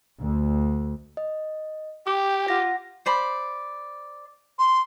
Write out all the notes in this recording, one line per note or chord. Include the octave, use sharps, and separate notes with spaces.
D2
D#5
G4 G5 D6
F4 F#5 A#6
C5 D5 B5
C6